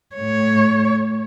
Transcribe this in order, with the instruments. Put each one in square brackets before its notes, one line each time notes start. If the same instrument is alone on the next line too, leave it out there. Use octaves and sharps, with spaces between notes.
[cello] A2 C#5